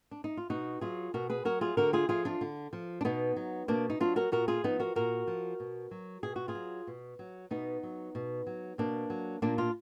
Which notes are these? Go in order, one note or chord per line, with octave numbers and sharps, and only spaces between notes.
D4
D#4
F4
B2 D#4 F#4
F#3 F4 G#4
B2 F#4 A#4
G#4 B4
F#3 F#4 A#4
F4 G#4
D3 F#4 A#4
F4 G#4
F3 F4 G#4
D4 F4
D3
F3
D4
B2 B3 D#4
F#3
B2 A#3 D4
D#4
F#3 D4 F4
F#4 A#4
A#2 F#4 A#4
F4 G#4
F3 B3 D#4
F#4 A#4
A#2 F#4 A#4
F3
B2
F#3
B2 G#4
F#4
F4 G#4
F#3
B2
F#3
B2 B3 D#4
F#3
B2
F#3
B2 A#3 D4
F#3
A#2 A#3 D4
D4 F4